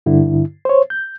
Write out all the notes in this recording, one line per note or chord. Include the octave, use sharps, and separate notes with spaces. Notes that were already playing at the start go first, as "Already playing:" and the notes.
G2 D3 E4
C5 C#5
G6